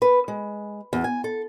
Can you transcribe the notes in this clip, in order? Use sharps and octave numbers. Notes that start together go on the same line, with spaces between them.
B4
G#3
E2
G#5
A4